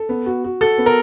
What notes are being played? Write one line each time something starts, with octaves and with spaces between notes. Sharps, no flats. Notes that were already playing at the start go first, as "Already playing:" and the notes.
Already playing: A4
B3
F#4
F#4
F#4 A4
B3
A#4